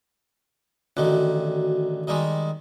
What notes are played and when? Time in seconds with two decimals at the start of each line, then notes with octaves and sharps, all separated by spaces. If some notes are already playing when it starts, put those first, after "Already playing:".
0.97 A1 D3 D#3 F#4
2.07 D#3 G3 G#3